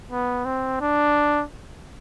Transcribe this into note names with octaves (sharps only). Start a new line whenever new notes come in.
B3
C4
D4